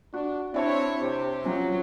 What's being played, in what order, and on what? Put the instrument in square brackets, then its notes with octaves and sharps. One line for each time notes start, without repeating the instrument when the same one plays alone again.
[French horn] D4 [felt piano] F#4
[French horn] C4 [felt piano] D4 A5 [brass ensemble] E4 C#5
[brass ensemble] C3 G4 [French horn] C5
[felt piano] F3 C#4 [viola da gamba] F#3